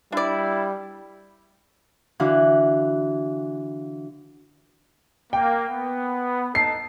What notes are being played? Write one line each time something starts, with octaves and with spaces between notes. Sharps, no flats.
G3 D4 E4 D5
D3 E3 F#4 F5 F#6
A#3 G5
B3
D#4 A4 C7